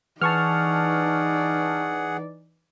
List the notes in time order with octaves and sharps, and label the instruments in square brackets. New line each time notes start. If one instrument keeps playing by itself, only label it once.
[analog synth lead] E3 [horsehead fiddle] D#4 D5 [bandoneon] G#4 F#5 [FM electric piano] A5 C#6 F6